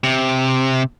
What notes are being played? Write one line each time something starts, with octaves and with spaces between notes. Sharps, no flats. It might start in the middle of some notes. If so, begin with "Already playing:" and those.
C3